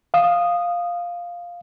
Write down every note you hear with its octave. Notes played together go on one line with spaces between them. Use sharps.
F5 D#6